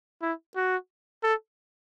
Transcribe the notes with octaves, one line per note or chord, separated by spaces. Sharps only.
E4
F#4
A4